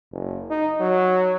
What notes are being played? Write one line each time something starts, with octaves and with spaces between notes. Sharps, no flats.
F#1
D#4
F#3